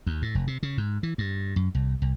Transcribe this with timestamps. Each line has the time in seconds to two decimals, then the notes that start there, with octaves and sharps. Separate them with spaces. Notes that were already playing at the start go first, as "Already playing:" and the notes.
0.07 D#2
0.22 A2
0.35 F1
0.47 C3
0.63 C#3
0.78 G#2
1.03 E3
1.18 G2
1.56 F#2
1.75 C2
2.02 C2